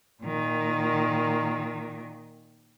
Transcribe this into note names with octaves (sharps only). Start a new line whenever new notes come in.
A#2 D#3